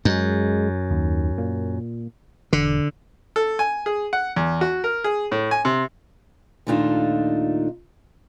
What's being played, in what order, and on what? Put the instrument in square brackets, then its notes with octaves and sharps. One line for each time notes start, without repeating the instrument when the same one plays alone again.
[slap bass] F#2 [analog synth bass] G#3
[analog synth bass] D#2
A#2
[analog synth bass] E1 [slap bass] D3
[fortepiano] A4
G#5
G#4
F#5
E2
F#4
A#4
G#4
A2
G#5
C3
[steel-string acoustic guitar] D#2 A#2 A3 D4 D#4 F4